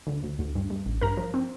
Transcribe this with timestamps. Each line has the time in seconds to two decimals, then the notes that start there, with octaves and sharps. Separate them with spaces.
0.07 D2
0.23 D2
0.39 D2
0.55 G2
0.70 G2
0.86 A1
1.01 G2 A#4 A#5
1.17 F3
1.34 C4